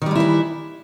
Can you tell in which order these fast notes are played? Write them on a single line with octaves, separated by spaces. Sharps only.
D#3 G3 G#3 E4 E3